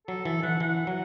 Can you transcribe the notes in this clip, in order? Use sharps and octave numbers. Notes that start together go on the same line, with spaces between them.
F#3 A4
E3 A4
E3 F#5
E3 F#5
F#3